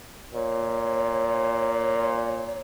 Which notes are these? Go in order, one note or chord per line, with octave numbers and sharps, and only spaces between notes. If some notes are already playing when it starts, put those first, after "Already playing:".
A#2 C#5